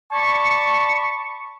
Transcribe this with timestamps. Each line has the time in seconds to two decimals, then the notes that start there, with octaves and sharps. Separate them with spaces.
0.12 D5 A5 B5 C#6